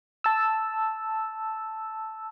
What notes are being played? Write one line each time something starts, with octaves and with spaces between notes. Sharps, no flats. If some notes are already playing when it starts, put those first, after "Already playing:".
A5 E6